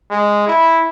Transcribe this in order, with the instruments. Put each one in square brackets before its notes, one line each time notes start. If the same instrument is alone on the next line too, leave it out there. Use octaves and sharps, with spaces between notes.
[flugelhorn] G#3
E4